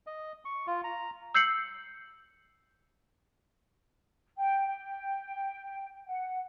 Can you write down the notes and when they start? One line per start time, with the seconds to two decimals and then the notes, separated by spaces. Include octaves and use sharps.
0.07 D#5
0.45 C#6
0.67 F4
0.84 A#5
1.34 E6 G6 C7 C#7 F#7
4.37 G5
4.67 G5
6.07 F#5